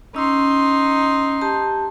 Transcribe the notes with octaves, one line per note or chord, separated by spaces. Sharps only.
C#4 D#4 C6 E6
G4 A5